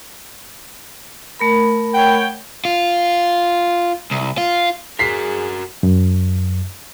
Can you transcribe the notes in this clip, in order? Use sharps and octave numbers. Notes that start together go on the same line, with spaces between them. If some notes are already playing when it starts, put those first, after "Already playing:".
A3 A#4 B5
C#5 F#5 G5
F4
C2
F4
F#4 G#4 A#4 B6 C7
F#2